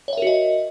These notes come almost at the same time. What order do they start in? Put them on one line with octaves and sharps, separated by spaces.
C#5 E5 A#4 F#4 D#5